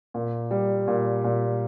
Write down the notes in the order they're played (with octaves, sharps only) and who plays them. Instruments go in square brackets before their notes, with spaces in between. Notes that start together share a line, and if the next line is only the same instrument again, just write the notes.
[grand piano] A#2
G3
A#2
A#2